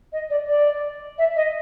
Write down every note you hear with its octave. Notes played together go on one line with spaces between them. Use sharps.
D#5
D5
D5
E5
D#5